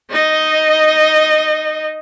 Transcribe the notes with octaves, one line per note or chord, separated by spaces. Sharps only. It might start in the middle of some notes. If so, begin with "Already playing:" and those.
D#4 D#5